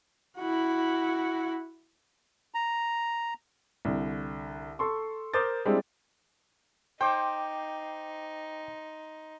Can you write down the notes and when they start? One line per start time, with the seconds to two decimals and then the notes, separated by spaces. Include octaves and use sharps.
0.38 E4 F#4
2.54 A#5
3.85 C2 D3
4.79 A4 C6 C#6
5.34 A#4 C5 D6 D#6 G6 A6
5.65 G3 G#3 C4 D4 E4
7.01 D#4 C5 G5 D6